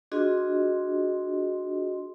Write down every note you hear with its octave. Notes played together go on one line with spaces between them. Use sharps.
D4 F4 F#4 G#4 D#5 C6